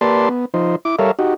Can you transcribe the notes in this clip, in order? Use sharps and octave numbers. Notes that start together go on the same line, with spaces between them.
A#3 G4 B4 D5 A5 C6
B3
F3 D#4 C5
E4 D6
G3 A4 A#4 C#5 E5 F5
D#4 F#4 G4